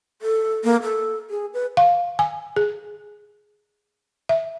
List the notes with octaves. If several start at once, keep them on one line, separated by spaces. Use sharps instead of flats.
A4
A#3
A4
G#4
B4
F5
G#5
G#4
E5